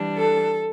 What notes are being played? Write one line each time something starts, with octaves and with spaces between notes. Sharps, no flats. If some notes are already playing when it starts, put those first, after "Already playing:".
Already playing: E3 G3 D4
A4